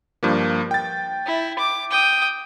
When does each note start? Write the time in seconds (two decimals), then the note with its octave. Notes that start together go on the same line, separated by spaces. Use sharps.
0.23 G2 F3 A#3
0.71 G5 A6
1.26 E4
1.59 D6
1.91 G5 D#6